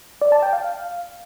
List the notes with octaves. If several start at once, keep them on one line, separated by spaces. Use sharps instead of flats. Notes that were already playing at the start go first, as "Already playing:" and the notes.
D5
A5
G5
F5